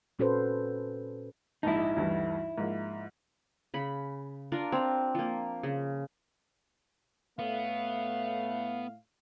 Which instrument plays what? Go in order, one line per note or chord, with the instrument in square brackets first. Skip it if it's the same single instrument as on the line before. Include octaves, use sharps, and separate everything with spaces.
[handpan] A#2 C#4 F#4 A4 B4 C5
[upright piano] A#1 G#2 A5 [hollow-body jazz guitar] D#4 E4
[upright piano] D2 G2 E3
G#2 F3 A#3
[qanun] C#3 B5
D4 F4 A#4
C4 A#5
F3 A#3
C#3
[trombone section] A2 A3 [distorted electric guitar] B3 [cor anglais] F5